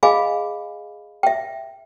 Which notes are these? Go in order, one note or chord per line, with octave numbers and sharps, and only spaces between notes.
G#4 D#5 F5 G#5 B5
E5 G5